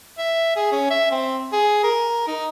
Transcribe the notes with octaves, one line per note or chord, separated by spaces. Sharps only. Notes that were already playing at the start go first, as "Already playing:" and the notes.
E5
G#4
C#4
E5
C4
G#4
A#4
D#4